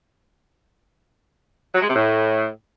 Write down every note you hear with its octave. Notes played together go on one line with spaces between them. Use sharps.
F#3
G#3
C3
A2